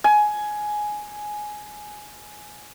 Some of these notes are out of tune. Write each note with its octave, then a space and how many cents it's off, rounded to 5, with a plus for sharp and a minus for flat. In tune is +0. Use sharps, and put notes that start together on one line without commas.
G#5 +10